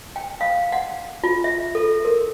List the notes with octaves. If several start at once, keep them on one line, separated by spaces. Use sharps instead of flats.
G5
F5
F#5
F4
E5
A4
A#4